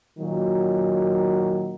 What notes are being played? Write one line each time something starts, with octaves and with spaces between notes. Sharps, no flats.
A#2 D#3 F#3